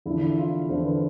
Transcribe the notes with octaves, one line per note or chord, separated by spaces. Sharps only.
E2 D3 F3 E4
E4
F4
E2 D3 F3 C5
B4